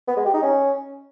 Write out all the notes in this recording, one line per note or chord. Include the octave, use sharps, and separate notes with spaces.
B3
G#3
G4
D#4
C#4